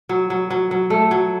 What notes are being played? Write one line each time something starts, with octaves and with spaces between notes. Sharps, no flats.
F#3
F#3
F#3
F#3
A3
F#3